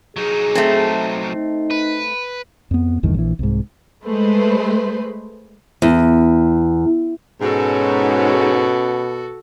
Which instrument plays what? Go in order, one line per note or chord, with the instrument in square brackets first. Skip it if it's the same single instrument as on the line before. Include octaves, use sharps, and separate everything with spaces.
[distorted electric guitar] F#3 D#4 [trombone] G#4
[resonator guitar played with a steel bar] A3 C4
[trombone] D#4
[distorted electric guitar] B4
[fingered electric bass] F2 B3
A#1 E2 G2 D#3
A#1 E3
C2 G#2
[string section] G#3 A3 B4 C5
[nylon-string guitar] E2
[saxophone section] G#2 [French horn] B2 [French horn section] C#4 [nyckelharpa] F#4 A4